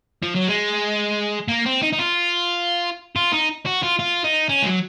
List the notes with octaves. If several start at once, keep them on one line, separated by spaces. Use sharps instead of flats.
F3
F#3
G#3
A#3
C4
D#4
D#4
F4
F4
D#4
F#4
F4
F4
D#4
C#4
G#3
F#3